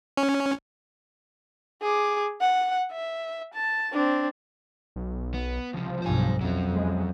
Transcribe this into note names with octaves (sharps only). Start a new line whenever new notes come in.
C#4
G#4 D6
F#5
E5
A5
C4 D4
B1
B3
C#2 C3 F3
B1 G2 C5 G#5
F2 F#3 C#4
G#3